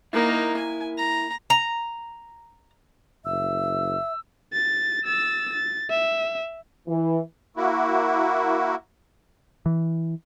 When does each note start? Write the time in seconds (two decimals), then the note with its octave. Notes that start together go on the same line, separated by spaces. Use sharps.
0.13 A#3 D#4 E4 A#4
0.57 G#5
0.98 A#5
1.50 A#5
3.25 F#1 E5 E6
4.53 A6
5.05 E6 A6
5.53 A6
5.90 E5
6.88 E3
7.57 A#3 E4 F#4
9.66 E3